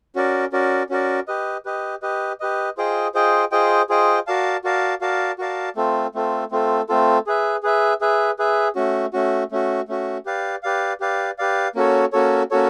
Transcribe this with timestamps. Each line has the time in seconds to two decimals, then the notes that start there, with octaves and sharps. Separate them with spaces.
0.16 C#4 F#4 A#4 D5
0.52 C#4 F#4 A#4 D5
0.89 C#4 F#4 A#4 D5
1.28 G4 B4 D#5
1.65 G4 B4 D#5
2.02 G4 B4 D#5
2.40 G4 B4 D#5
2.77 F4 G#4 C5 D#5 G5
3.14 F4 G#4 C5 D#5 G5
3.52 F4 G#4 C5 D#5 G5
3.89 F4 G#4 C5 D#5 G5
4.27 F#4 A#4 D5 F5 A5
4.64 F#4 A#4 D5 F5 A5
5.01 F#4 A#4 D5 F5 A5
5.39 F#4 A#4 D5 F5 A5
5.76 A3 C4 F4 A4
6.15 A3 C4 F4 A4
6.51 A3 C4 F4 A4
6.89 A3 C4 F4 A4
7.27 G#4 B4 E5
7.63 G#4 B4 E5
8.01 G#4 B4 E5
8.39 G#4 B4 E5
8.75 A3 C#4 F#4
9.13 A3 C#4 F#4
9.51 A3 C#4 F#4
9.88 A3 C#4 F#4
10.26 G4 B4 D5 F5
10.63 G4 B4 D5 F5
11.00 G4 B4 D5 F5
11.39 G4 B4 D5 F5
11.75 A#3 C#4 F#4 A4 C#5
12.12 A#3 C#4 F#4 A4 C#5
12.51 A#3 C#4 F#4 A4 C#5